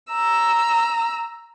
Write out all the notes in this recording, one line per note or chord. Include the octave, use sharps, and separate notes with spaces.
A#5 E6